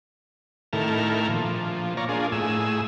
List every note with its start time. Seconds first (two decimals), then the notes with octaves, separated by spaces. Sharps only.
0.73 A2 D#3 E4 A4 A#4 F6
1.30 A#2 F3
1.97 C#5 D5 F5 A#5
2.09 A#3 D4 F4 G#4
2.32 A2 G#4 E6